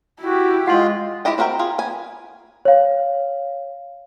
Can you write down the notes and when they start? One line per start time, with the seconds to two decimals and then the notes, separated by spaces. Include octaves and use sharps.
0.21 E4 F#4 G4
0.67 G#3 F4 F#5 C6
1.25 G#3 E4 G4 D#5 G5
1.38 C4 D4 F#4 A#4 G5
1.59 F4 G#4
1.78 B3 G#5
2.65 C#5 F5